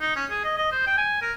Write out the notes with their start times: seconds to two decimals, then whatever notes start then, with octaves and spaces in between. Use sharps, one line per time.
0.01 D#4
0.16 C#4
0.30 G#4
0.44 D#5
0.58 D#5
0.72 C5
0.87 G5
0.98 G#5
1.22 A#4